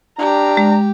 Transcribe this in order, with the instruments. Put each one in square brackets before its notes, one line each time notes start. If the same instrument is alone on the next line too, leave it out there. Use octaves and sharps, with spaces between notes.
[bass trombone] D4 [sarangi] G4 [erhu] A#5
[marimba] G#3